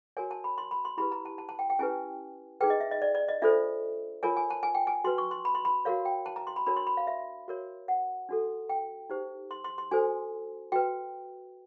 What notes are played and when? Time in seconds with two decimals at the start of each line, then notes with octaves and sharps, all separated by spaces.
0.17 F#4 A#4 C#5 G#5
0.31 A5
0.44 B5
0.58 C6
0.71 B5
0.85 C6
0.98 E4 G4 B4 B5
1.12 A#5
1.25 A5
1.38 A5
1.49 A5
1.59 G5
1.70 G5
1.79 C#4 E4 G4 B4 G#5
2.60 D#4 G#4 B4 G5
2.70 D#5
2.80 E5
2.91 D#5
3.02 D5
3.15 D5
3.28 D#5
3.42 D4 F4 A4 C5 E5
4.23 F4 A#4 C#5 G#5
4.37 G#5
4.50 A5
4.63 G#5
4.75 G5
4.87 G#5
5.04 F#4 B4 C6
5.18 C#6
5.31 C6
5.45 B5
5.55 C6
5.65 B5
5.85 F#4 A#4 C#5 F5
6.05 G5
6.26 A5
6.36 A#5
6.47 C6
6.56 B5
6.66 D4 F#4 A#4 C#5 B5
6.76 C6
6.87 B5
6.97 F5
7.07 E5
7.48 F#4 A#4 C#5
7.88 F#5
8.29 D4 F#4 A4
8.69 G5
9.10 D#4 G4 C5
9.51 C6
9.64 C6
9.78 C6
9.91 D4 F#4 A4 C5 G#5
10.72 F#4 B4 G5